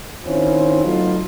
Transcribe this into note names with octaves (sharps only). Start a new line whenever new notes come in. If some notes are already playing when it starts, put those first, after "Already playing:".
D#3 C4 C#4 E4 F4
F#3 A3 B3 D#4 F4